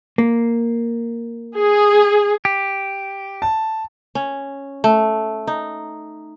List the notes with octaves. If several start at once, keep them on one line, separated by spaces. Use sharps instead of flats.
A#3
G#4
G4
A5
C#4
A3
D#4